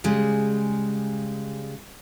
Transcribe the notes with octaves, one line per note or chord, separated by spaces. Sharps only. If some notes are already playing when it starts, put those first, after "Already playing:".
C#3 G3 G#3